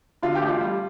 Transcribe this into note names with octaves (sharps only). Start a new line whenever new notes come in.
D3 F4
G4
A1
F4
G3